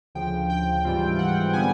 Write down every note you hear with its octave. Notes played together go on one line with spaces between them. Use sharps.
D2 C#3 F3 G5
G5
G#2 E3 G3 C4 F4
F#5
D3 G3 B3 G#5